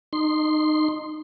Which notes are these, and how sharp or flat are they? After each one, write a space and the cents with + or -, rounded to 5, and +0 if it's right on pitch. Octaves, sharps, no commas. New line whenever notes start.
D#4 -20 C6 +0